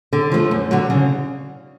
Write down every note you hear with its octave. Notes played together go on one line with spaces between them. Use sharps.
D3
F3 A3
F#2
D3 F#3
C#3